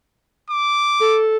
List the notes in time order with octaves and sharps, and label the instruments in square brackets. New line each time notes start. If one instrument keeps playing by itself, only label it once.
[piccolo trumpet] D6
[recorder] A4